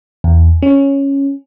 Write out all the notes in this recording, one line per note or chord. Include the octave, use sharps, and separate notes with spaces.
E2
C#4